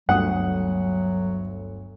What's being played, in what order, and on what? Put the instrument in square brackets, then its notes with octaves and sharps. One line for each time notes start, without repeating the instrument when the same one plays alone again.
[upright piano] G1 D2 D#6 [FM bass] G2 [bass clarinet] F#3 [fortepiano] F#5